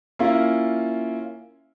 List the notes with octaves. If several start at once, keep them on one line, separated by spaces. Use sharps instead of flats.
A#3 C#4 E4 F4